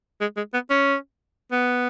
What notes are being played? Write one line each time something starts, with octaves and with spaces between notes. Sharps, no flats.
G#3
G#3
B3
C#4
B3